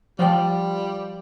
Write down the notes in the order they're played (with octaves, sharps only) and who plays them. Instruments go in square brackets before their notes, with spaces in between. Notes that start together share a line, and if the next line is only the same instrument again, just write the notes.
[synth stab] F3 [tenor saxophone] G3 [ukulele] F4 G5